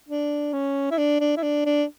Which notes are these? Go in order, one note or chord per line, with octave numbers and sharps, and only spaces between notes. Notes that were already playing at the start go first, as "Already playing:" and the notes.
D4
C#4
E4
D4
D4
E4
D4
D4